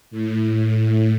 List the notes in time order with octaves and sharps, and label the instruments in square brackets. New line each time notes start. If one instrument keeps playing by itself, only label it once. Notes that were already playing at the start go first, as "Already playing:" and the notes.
[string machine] A2